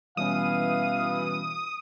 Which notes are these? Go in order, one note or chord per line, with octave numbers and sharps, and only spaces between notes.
B2 E3 G3 C#4 F5 D#6